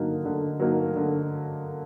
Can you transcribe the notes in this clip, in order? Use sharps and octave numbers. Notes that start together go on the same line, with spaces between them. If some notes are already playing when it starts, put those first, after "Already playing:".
Already playing: D3 F#3 A#3 D#4
D3
F#3 A#3 D#4
D3